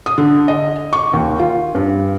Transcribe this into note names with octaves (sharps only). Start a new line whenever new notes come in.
D#6
D3
D#5
C#6
D#2
F4
G2